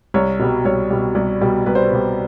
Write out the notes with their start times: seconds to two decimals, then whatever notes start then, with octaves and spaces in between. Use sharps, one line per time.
0.14 C2 C#5
0.39 B2 G3
0.65 C2 C#5
0.90 B2 G3
1.15 C2
1.41 B2 G3
1.66 C2 B4
1.75 C5
1.84 B4
1.92 B2 G3